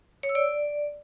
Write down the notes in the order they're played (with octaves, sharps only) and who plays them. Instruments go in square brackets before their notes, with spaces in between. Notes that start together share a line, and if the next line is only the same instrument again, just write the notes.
[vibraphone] C#5
E6
D5